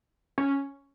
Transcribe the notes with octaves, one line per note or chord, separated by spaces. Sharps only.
C#4